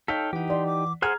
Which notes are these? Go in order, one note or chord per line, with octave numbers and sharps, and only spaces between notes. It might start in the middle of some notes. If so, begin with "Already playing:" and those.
D#4 A4 C#5 D#5 F5 G5 B6
E3 D#4 G4 F#5
D5 C6
D6
G#4 C5 F#5 G#5 A#5 F6 G#6